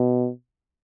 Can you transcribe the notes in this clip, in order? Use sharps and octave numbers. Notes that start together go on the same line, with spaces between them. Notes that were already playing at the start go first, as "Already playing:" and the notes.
Already playing: B2